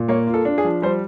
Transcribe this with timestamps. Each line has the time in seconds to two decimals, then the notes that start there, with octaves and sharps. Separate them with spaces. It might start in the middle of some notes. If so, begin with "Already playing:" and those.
Already playing: A#2
0.08 A#3 C#5
0.27 F4
0.34 A4
0.45 D4
0.58 G#4
0.64 F3
0.82 G3 C5